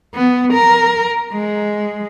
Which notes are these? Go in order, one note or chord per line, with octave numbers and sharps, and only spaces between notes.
B3
A#4
G#3